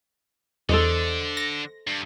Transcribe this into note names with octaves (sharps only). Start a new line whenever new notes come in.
E2 D3 A4 C5 D#5
A#6
G2